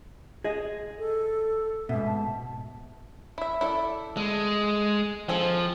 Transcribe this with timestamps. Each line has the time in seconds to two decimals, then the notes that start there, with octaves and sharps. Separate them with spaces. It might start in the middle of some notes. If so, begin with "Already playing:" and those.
0.44 G#4 D#5
0.99 A4
1.89 G#2 B2 E5
2.06 A5
3.38 E4 E5
3.61 E4 A4 D5
4.17 G#3 A4
5.29 F3 C4 G#4 A4